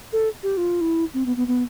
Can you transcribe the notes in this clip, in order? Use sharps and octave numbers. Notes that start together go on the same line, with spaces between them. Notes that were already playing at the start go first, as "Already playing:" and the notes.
A4
G4
F4
E4
C4
B3
B3
B3